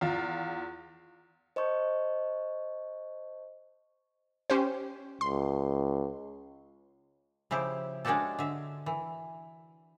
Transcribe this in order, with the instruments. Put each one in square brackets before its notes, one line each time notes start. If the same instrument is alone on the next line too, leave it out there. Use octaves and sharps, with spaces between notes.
[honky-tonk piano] E2 F4
[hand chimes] C5 D#5 A5 C#6 G6
[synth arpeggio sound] C#4 G4 C5
[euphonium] C#2 [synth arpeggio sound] C6
[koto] C#3 F3 E4 G4
G#3 C#4 D4 F#4 G4 A4
D3 E5
E3